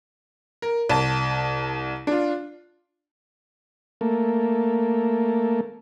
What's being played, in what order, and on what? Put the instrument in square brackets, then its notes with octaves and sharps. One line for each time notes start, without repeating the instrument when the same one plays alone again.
[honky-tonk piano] A#4
C2 A5
D4 F4
[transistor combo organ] A3 A#3